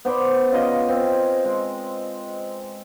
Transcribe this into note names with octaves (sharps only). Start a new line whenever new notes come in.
B3 C5 D5 B5
C#3 F4 D#5
C4
G#3